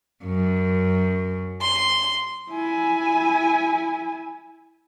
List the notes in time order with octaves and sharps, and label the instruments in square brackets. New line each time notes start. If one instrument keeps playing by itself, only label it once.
[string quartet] F#2
C6
[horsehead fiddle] E4 G#5